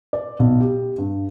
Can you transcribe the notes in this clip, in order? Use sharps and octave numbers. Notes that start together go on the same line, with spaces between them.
D5
B1
G4
G2